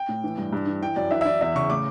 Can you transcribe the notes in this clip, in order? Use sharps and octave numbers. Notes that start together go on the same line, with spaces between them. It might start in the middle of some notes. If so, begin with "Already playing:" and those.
Already playing: G5
A2
E3
G2
G2
E3
E3 G5
F#2 D5
E3 E5
E5
E3 D5
E2 E5
C#3 C#6
A2 D6